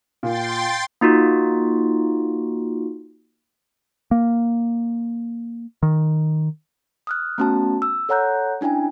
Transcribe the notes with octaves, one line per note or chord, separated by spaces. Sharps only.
A#2 G5 C6 A6
A#3 D#4 F4 F#4
A#3
D#3
D#6 F6 F#6
A3 B3 C#4 F#4 A5
E6
A4 C#5 F#5 A#5 F#6 G6
C#4 D4 E4 G5 G#5